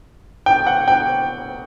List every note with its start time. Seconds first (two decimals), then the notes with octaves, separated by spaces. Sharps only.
0.46 G5
0.66 F#5
0.88 G5